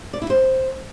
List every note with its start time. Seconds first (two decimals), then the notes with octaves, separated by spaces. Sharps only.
0.13 D5
0.22 E4
0.30 C5